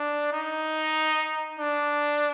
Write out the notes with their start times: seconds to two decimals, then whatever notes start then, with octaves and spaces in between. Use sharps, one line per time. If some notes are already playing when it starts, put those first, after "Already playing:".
Already playing: D4
0.32 D#4
1.59 D4